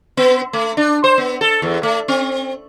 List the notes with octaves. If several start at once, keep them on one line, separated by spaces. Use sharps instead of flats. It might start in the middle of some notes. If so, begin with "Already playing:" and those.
B3
A3
D4
C5
B3
A4
E2
A3
C4